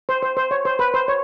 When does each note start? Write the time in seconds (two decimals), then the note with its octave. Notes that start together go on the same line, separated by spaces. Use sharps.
0.09 C5
0.22 C5
0.37 C5
0.51 C#5
0.65 C5
0.79 B4
0.94 C5
1.08 C#5